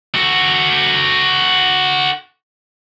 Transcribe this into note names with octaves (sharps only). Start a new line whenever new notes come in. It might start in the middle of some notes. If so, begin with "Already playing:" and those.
F#4 A4